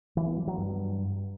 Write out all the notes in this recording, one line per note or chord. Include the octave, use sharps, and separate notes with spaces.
E3
B3
F#3
F#3
G2